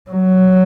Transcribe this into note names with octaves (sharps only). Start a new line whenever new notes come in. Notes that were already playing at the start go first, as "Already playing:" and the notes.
F#3